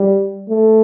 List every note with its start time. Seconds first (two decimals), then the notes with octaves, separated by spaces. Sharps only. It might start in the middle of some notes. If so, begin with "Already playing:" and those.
Already playing: G3
0.49 A3